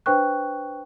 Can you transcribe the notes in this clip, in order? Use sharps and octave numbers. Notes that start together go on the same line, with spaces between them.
D4 B4 C5 G5 C#6 F#6